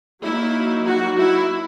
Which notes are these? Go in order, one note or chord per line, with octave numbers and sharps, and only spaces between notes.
F#3 A#3 D#4 E4
F#4
E4